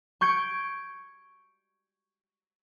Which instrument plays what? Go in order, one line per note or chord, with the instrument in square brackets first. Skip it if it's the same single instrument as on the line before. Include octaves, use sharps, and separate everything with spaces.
[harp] C#6 G6 G#6 C#7 D7